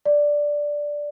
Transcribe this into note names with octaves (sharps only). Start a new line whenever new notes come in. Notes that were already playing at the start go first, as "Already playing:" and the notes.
D5